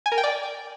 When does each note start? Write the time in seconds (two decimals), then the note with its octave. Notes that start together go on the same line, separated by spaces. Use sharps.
0.06 G#5
0.12 A#4
0.18 G5
0.24 D5